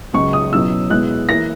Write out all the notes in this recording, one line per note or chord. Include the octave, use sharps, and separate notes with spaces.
C#2 C#3 F#3 C#6
D#6
B2 F#3 C#4 E4 E6
B2 G#3 B3 E4 F#6
E3 A#3 E4 A#6